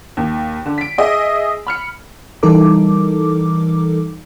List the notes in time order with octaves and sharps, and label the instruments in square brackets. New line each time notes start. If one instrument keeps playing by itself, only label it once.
[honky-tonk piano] D#2
D3
B6 D7
G#4 D#5 E5
B5 F6 C#7
[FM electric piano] E3 G3 D#4 A4 A#4 D6